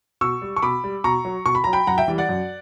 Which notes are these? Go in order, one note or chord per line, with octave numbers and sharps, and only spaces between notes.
B2 C#6 E6
G3
C#6
B2 B5 D6
G3
B2 A#5 C#6
F#3
B2 C#6
B5
F#3 A#5
G5 B5
F#2 F#5 A#5
E5 G5
E3 G3
D5 F#5
F#2